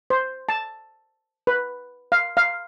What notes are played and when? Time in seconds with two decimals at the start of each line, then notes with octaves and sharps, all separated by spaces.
0.10 C5
0.49 A5
1.47 B4
2.12 F5
2.37 F5